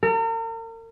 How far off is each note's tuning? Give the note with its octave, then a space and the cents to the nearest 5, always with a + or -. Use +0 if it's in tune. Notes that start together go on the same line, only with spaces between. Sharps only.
A#4 -40